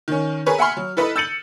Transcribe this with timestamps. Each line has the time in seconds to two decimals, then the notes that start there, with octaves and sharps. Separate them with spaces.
0.08 D#3 C#4
0.46 G#4 A#4 B4 C#5
0.58 E5 F#5 G#5 B5 C6 F6
0.77 F#3
0.97 E4 A4 B4 D#5 B5
1.16 E6 G6 A6 C#7 D#7 F#7